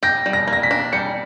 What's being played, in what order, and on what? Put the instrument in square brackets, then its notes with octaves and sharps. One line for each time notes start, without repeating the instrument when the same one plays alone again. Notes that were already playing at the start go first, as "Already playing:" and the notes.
[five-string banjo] G4 [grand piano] A#6
[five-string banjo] G3
[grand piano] A#6
[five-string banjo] A#3
[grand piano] A#6
B6
[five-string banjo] D4
[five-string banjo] G3 [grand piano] C#7